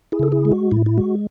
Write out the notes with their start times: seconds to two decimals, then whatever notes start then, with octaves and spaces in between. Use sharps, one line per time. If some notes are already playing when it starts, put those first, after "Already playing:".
0.12 E4 G#4
0.19 C#3 A4
0.32 E4 G#4
0.45 G#3
0.52 F#4
0.71 A2 E4
0.86 E4
0.98 G#3 F#4